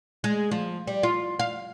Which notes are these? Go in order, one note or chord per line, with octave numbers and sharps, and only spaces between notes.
G#3
F3
G3
F4
F5